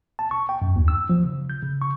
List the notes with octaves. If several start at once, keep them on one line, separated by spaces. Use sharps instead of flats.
A5
C#6
G5
F#2
D#2
E6
F3
C#3
G6
C#3
C#6